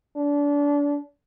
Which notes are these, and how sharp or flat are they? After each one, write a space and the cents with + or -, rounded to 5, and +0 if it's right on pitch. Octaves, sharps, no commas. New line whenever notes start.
D4 -30